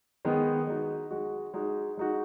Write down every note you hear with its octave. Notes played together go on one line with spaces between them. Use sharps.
D#3 G#3 B3 D#4 G#4
G#3 D#4 F#4
G#3 D#4 F#4
G#3 D#4 F#4
G#3 D#4 F#4